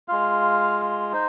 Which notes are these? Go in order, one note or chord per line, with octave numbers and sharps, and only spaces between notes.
G#3 F4 F5
D#4 C5